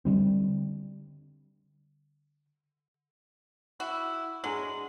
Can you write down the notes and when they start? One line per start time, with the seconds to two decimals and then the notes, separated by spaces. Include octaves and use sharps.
0.05 D3 G3 C4
3.80 E4 F#4
4.44 F#3 G#3 D4 G#4 F#7